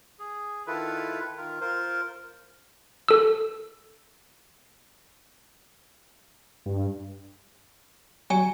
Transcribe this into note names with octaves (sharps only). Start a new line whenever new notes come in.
G#4
D#3 E4 F4 A4 B4
D#3 F4 A#4
F4 A#4 C5
A4 E6
G2
F#3 G#5